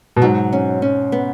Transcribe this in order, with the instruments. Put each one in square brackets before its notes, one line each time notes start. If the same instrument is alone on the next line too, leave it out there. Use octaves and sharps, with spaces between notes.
[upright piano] B2
[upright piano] G#2 [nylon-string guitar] F#3
[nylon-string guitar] C#4
C#4
B3